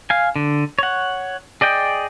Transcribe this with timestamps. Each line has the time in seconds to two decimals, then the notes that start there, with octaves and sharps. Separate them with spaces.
0.10 F5 G#5
0.36 D3
0.79 C#5 F#5
1.61 G#4 D5 D#5 G5